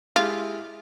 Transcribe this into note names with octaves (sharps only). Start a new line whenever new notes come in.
G#3 E4 F4 G4